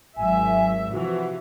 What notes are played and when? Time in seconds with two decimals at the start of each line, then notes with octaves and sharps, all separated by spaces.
0.17 G#1 F#3 E5 G#5
0.92 C3 E3 F3 F#4